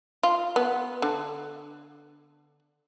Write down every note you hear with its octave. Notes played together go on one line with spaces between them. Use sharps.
F4
B3
D3